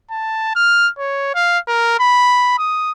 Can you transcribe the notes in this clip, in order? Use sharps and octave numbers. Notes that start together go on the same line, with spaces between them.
A5
F6
C#5
F5
A#4
B5
D#6